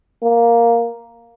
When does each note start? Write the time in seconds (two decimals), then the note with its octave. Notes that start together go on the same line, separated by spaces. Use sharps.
0.23 A#3